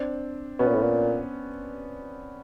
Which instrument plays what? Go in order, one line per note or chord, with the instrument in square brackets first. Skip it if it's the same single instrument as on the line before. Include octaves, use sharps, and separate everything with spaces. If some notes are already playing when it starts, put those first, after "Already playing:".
Already playing: [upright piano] C4 D4
[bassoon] B2 [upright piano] B3 C#4
[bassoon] A#2
A2
A#2